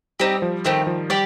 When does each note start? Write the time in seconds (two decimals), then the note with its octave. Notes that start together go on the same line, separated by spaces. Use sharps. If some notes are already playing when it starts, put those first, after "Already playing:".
0.20 G3 C4 D#4 G4
0.42 F3
0.65 D#3 A3 C4 G4
0.87 F3
1.10 G3 G4 D5